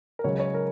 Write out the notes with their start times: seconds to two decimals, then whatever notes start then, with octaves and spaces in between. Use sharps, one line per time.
0.19 A#4
0.24 C#2 C#3 F#3 C#5
0.40 C#5
0.54 A#4